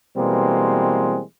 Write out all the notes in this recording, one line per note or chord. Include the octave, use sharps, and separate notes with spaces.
B2 E3 G3 G#3 A#3 C4